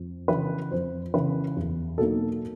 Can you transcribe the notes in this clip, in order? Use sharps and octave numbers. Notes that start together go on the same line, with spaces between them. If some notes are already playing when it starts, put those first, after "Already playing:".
Already playing: F2
C#3 E3 B4
F2 C5
C#3 E3 B4
E2
B2 F#3 A#3 D#4 A4